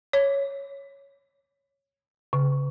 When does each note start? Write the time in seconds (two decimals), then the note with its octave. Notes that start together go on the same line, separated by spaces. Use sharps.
0.13 C#5
2.33 C#3